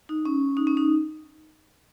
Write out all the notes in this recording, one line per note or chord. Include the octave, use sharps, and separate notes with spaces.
D#4
C#4
D#4
C#4
D#4